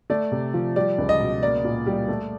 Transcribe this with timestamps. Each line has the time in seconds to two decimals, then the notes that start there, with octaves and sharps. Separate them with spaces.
0.10 A3 D5
0.32 C3
0.54 F3
0.76 G3 D5
0.98 C#2
1.09 D#5
1.20 B2
1.42 A#3 D5
1.64 A#2
1.86 G3
2.08 A3